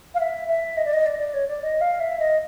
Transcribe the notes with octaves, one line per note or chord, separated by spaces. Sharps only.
F5
E5
E5
D#5
D5
D#5
D5
D5
C#5
D5
D#5
F5
E5
D#5